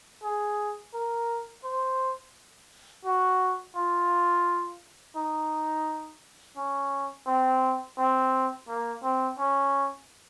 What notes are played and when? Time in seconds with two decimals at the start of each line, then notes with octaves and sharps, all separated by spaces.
0.23 G#4
0.94 A#4
1.64 C5
3.05 F#4
3.76 F4
5.16 D#4
6.57 C#4
7.27 C4
7.98 C4
8.68 A#3
9.03 C4
9.38 C#4